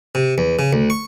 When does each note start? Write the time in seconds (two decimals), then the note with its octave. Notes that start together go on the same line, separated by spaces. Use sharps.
0.15 C3
0.38 E2
0.59 C#3
0.73 D2
0.90 C#6